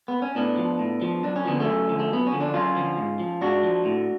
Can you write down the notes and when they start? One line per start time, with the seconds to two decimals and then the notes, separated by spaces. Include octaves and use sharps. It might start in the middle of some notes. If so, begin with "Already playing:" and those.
0.08 B3
0.22 C#4
0.35 A2 B3 D4
0.58 F3
0.79 A2
1.02 F3
1.23 F#2 D4
1.36 C#4
1.45 D3 F3 B3
1.60 A3 C#4
1.67 F#2
1.89 D3 F3
1.99 A3
2.10 F#2 B3
2.27 C#4
2.33 D3 F3
2.41 D4
2.54 F#2 C#4 F4
2.76 D3 F3
2.98 G#2
3.19 F3
3.41 G#2 D4 F#4
3.63 F3
3.85 A2